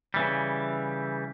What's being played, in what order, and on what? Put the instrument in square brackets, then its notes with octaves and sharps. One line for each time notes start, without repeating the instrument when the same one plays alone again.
[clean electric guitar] C#3 E3 G3